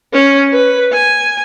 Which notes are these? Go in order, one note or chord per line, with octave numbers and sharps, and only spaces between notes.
C#4
B4
G#5